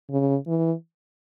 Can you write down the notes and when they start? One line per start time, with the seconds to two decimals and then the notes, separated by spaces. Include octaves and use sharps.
0.10 C#3
0.47 E3